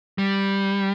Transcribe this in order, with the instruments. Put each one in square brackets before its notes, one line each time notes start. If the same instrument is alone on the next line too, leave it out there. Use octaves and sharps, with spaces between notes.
[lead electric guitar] G3